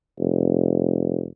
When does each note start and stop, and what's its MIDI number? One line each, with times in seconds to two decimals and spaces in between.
0.19 1.26 29